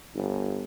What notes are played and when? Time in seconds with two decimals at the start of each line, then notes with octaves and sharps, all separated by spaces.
0.14 G1